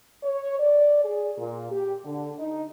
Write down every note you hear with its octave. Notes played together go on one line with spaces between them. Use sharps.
C#5
D5
G#4
A#2
G4
D3
D#4